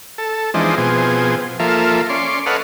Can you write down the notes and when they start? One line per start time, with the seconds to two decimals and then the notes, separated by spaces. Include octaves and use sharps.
0.18 A4
0.54 E3 F3 G#3 C4 D4 D#4
0.78 B2 F3 C4 G#4
1.59 F3 A#3 F4 A4 E5
2.10 C#4 D5 C6
2.46 A4 B4 C#5 D#5 F5 F#5